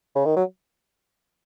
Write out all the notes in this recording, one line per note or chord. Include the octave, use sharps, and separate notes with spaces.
C#3
D#3
F#3